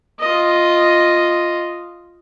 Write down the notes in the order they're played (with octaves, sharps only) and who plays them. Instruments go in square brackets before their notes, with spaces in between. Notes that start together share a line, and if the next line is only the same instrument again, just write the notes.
[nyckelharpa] F4 D#5